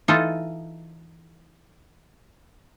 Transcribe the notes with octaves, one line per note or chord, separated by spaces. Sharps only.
E3 D#4 F4 A4 D#5